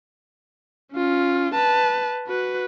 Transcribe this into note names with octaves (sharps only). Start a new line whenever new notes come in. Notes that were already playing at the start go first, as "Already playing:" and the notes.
C#4 F4
B4 A5
F#4 B4